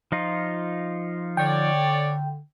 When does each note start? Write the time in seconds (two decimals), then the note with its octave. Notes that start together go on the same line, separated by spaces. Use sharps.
0.12 F3 D#4 F4
1.37 D3 C#5 D5 G5